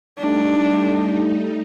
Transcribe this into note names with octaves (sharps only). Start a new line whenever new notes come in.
G3 A3 D4 D#4